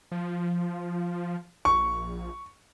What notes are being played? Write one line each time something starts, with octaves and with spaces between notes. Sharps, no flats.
F3
A#1 C#6